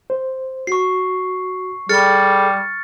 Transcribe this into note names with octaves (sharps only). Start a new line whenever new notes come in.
C5
F#4 C#6 C7
G3 G#4 A4 F6 A6 C#7